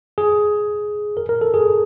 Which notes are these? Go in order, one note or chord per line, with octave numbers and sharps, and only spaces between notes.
G#4
A#4
A#4
A4
G#4